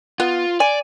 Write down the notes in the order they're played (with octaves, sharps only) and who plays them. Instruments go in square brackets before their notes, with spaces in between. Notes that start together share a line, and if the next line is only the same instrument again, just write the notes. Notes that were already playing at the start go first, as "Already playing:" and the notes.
[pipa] B3 [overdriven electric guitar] F4
[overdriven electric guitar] D5 [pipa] G#5